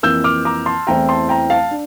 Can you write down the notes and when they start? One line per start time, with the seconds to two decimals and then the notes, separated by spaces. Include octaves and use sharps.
0.03 F2 E3 A#3 E6 G6
0.24 D6 F6
0.45 A#5 D6
0.66 A5 C6
0.87 E2 E3 A3 C4 E4 G5 A#5
1.09 A5 C6
1.29 G5 A#5
1.50 F5 A5
1.71 D4